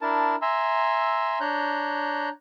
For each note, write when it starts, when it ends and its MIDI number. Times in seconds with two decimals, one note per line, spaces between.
0.01 0.35 62
0.01 0.35 64
0.01 0.35 70
0.01 0.35 81
0.42 1.39 76
0.42 1.39 80
0.42 1.39 82
0.42 1.39 84
0.42 1.39 88
1.40 2.29 62
1.40 2.29 73
1.40 2.29 82
1.40 2.29 90
1.40 2.29 91